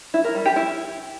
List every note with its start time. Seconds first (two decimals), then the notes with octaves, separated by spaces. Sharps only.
0.14 E4
0.24 A#4
0.35 G3
0.46 G4
0.56 E4